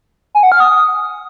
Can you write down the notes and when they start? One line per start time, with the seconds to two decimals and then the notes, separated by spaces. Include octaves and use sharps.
0.35 G#5
0.43 F#5
0.52 F6
0.60 D#6